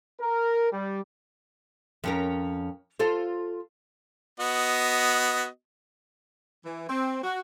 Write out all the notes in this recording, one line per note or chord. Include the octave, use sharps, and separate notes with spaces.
A#4
G3
F2 C#4 A#4
F4 A4 C5
B3 F#4 D#5
E3
C4
F#4